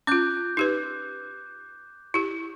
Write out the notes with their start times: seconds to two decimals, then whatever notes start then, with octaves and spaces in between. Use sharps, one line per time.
0.07 C#4 F4 D6 F#6 G6
0.57 D#4 G4 B4
2.14 E4 G4